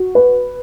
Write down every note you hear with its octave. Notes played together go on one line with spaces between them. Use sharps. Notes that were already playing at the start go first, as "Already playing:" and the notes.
Already playing: F#4
B4